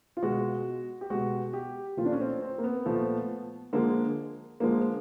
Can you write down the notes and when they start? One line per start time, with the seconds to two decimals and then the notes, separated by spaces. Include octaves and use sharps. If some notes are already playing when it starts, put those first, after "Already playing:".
0.17 F4
0.23 B2 G#3 F#4
1.01 G4
1.10 B2 G#3 F#4
1.53 G4
1.97 A#2 F3 A3 F4
2.05 D4
2.12 C#4
2.20 C4
2.42 C4
2.58 A#3
2.64 B3
2.86 A#2 F3 A3
3.73 D3 F3 G#3 A#3
4.60 D3 F3 G#3 A#3